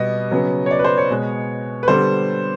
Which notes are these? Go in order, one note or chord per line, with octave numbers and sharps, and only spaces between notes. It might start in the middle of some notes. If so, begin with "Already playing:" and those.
Already playing: B2 G3 B3 D#5
C#3 F#3 B3
C#5
D5
B4
C5
C#5
B2 G#3 B3
B4
D3 G3 B3 C5